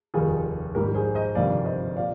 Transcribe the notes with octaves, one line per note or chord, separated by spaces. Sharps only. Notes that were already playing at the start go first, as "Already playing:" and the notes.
F1 D#2 D#3 G3 F4 G#4
A#1 G#2 D#3 G3 G4 A#4
G#4 C5
C5 D#5
G1 F2 C3 D#3 G3 D5 F5
C5 D#5
A#2 D5 F5